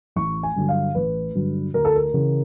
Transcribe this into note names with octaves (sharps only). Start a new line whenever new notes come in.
A1 C#6
G#5
G2 D3 F#3
F5
A1 B4
G2 D3 F#3
D2 A#4
A4
A#4
C#3 E3